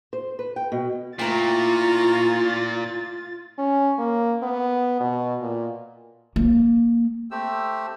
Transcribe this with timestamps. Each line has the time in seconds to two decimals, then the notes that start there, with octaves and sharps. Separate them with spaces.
0.13 C5
0.39 B4
0.56 G5
0.72 B2
1.19 A#2 A3 E4 F4 G5 A#5 C#6 A6
3.59 C#4
3.98 A#3
4.43 B3
5.00 B2
5.41 A#2
6.36 A#3
7.31 A3 C4 G4 E6